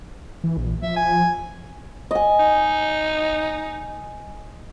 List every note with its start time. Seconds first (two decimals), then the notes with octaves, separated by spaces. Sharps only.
0.44 E3
0.57 A#1
0.82 F3 E5
0.96 G#5
2.11 D#5 G#5
2.39 D#4